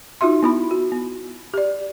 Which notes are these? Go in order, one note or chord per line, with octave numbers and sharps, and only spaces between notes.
D#4 F4 F#4 E5 C6
B3 E4 B5
F#4
B3
G4 D5